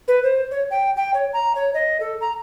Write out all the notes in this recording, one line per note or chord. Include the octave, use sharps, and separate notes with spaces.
B4
C5
C#5
G5
G5
C#5
A#5
C#5
D#5
A4
A#5